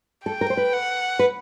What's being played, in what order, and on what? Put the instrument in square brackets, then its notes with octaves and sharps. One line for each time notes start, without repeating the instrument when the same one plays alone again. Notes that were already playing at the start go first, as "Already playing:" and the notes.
[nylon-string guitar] A4 [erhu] G5
[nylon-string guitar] A#4
C5
B4
[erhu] F#5
[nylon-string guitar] B4